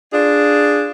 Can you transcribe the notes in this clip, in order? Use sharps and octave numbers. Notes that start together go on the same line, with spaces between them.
D4 F4 G#4